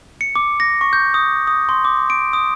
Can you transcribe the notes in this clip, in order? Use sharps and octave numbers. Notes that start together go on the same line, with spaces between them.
C#7
D6
A#6
C#6
G6
D#6
D#6
C6
D6
D7
D#6